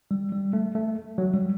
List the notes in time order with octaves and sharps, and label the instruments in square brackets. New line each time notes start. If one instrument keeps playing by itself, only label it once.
[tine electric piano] G3
G3
A3
A3
F#3
G3